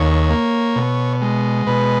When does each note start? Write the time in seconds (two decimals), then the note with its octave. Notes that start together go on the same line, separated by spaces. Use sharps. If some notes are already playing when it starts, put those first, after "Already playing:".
Already playing: D#2 C#5
0.30 A#3
0.76 B2
1.22 G#3
1.67 B2 B4